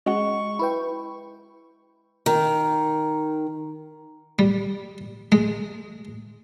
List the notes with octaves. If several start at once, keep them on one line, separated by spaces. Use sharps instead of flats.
G#3 C#4 F#4 D#5 F#5 C#6
E4 B4 G5 B5
D#3
G3
G#3